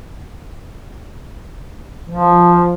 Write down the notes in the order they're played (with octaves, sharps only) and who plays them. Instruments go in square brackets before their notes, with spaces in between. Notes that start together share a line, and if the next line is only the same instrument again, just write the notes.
[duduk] F3